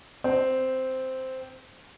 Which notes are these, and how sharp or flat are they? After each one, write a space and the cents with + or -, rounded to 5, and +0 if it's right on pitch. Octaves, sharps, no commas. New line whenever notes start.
C4 -5